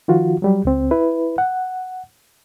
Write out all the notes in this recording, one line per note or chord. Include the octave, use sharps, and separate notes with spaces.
D#3 F3 F4 F#4
F#3 G3 G4
C#2 C4
E4 B4
F#5